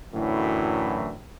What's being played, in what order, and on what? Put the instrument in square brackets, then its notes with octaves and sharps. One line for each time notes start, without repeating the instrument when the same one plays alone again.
[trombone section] F#2 A2 D3 E3 F#3